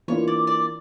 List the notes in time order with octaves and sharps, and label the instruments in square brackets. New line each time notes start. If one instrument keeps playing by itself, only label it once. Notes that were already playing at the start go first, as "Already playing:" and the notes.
[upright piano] E3 A#3 D4 F4 [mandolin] C#5
[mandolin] D5
D5